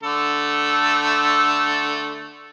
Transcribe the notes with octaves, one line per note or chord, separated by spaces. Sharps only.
D3 A3 A4